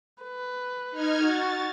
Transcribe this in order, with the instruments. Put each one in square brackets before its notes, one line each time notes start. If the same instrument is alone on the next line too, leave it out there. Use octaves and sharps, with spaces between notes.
[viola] B4
[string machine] D#4 F6 G#6
[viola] F#4 [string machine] A6